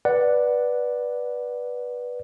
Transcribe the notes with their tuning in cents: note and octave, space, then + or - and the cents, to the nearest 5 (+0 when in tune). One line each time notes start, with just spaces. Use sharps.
B4 -10 D5 +5 F#5 +0